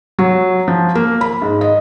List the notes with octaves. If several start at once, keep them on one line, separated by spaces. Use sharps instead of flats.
F#3
F3
A#3
B5
G#2
D#5